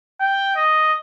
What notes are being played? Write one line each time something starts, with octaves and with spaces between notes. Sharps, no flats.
G5
D#5